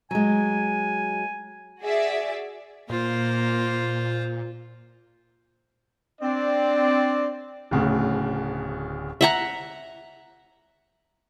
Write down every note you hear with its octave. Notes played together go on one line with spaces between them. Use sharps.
F#3 G#3 G#5
F#4 G#4 D5 E5
A#2 A#3 F4 C5
C4 D4 D5
D1 D2 C#3
E5 F#5 A#5